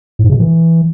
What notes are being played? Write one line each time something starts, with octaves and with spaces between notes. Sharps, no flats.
A2
G#2
C#3
B2
E3